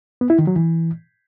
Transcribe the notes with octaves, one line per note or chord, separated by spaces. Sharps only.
B3
E4
D#3
F#3
E3